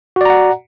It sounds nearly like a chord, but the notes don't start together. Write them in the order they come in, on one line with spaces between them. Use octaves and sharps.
F#4 D5 A#5 F#5